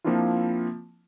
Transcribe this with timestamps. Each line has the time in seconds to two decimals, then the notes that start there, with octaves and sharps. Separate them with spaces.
0.04 F3 A#3 C4 D4 E4 F4